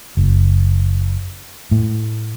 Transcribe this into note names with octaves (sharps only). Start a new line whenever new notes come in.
F#1
A2